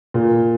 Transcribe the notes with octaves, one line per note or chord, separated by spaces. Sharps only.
A#2